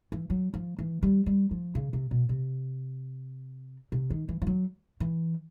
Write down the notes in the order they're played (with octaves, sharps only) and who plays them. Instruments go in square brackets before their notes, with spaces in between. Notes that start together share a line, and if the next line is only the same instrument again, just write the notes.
[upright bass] E3
F#3
F3
E3
G3
G3
F3
C#3
C3
B2
C3
C3
D#3
E3
F3
F#3
E3